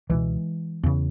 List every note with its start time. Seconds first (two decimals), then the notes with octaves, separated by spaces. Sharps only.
0.10 C#2 B2 E3 G#3
0.83 E2 C#3